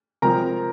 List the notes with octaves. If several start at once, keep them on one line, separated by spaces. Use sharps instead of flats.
C3 F3 G#3 C4 A#4 A#5